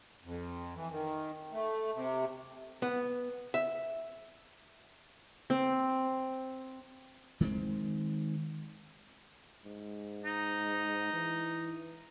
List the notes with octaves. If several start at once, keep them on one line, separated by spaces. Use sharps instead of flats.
F2
E3
D#3
A3
C3
B3
E5
C4
D#3 G#3 A#3 C4
G#2
D#4
E3